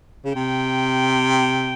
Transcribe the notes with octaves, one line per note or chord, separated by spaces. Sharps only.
C#3
C3 G5